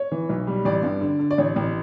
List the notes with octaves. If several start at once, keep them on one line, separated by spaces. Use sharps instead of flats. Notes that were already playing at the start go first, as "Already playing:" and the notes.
Already playing: C#5
E3
B1
G3
A1 D5
G2
D3
D3
D5
A1 C#5
A1